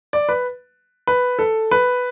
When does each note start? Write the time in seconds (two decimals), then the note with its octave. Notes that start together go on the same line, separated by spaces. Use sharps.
0.13 D5
0.29 B4
1.07 B4
1.39 A4
1.71 B4